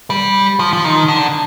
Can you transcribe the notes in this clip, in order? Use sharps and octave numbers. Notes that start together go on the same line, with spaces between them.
G3
F3
F3
D#3
D3